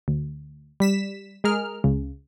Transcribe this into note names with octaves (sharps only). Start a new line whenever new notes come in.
D2
G3 B6 E7
G#3 G#4 A#4 F6
C#2 C#3